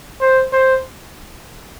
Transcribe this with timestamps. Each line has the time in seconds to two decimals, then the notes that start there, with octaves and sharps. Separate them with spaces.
0.21 C5
0.53 C5